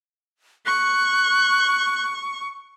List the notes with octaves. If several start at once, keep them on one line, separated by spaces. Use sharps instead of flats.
C#6 F#6